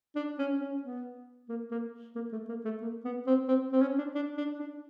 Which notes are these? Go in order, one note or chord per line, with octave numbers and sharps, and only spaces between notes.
D4
C#4
C#4
B3
A#3
A#3
A#3
A3
A#3
A3
A#3
B3
C4
C4
C4
C#4
D4
D4
D4
D4